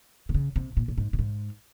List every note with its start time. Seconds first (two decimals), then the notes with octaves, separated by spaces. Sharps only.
0.29 C3
0.34 C#3
0.56 C3
0.77 A#2
0.88 A#2
0.98 G#2
1.13 A#2
1.19 G#2